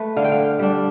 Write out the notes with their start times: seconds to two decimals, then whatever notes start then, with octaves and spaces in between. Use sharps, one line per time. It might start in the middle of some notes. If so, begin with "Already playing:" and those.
Already playing: A3 B4
0.16 D3 F5
0.24 G5
0.32 F5
0.59 G3 D4